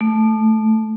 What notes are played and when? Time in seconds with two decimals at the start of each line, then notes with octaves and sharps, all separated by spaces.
0.01 A3